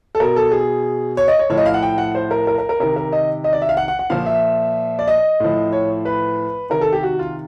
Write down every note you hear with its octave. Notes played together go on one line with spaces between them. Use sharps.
A4
B2 A#4
A4
G#4
C#5
D#5
C#5
A2 F3 C#5
D#5
F5
F#5
G5
F#5
C5
A#4
A#4
A#4
A#4
C3 D#3 A#4
A#4
D#5
D#5
D5
E5
F5
F#5
F#5
F#5
A#2 F3 F5
E5
D5
D#5
A2 F3
C#5
B4
C3 D#3 A#4
A4
G4
F#4
F4